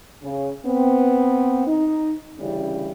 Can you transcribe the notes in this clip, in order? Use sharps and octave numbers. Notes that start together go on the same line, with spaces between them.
C#3
B3 C4
D#4
D2 C#3 E3 G3 C#4